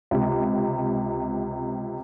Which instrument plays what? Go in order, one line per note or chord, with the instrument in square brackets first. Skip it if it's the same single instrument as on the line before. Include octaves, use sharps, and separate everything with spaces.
[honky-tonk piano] C#2 C3